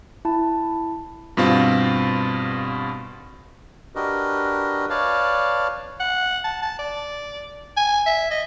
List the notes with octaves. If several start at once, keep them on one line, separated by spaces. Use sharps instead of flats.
E4 A5
G2 B2 C4 F4
D4 F#4 G4 A#4 B4 D#5
B4 C#5 D5 F5 A5
F#5
A5
A5
D5
G#5
E5
D#5